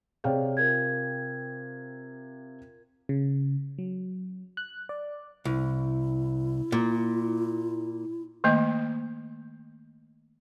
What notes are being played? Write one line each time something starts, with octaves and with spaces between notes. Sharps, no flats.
C3 G#4 C#5 D5 F5 G5
F4 A#4 G#6
C#3
F#3
F#6
D5
C2 E4
A#2
D#3 A3 A#3 D#5